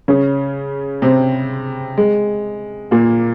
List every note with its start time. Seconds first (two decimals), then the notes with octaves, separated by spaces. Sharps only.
0.08 C#3 C#4
1.02 C3 C4
1.98 G#3
2.91 A#2 A#3